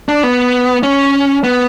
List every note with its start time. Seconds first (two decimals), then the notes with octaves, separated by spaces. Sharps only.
0.08 D4
0.23 B3
0.83 C#4
1.44 B3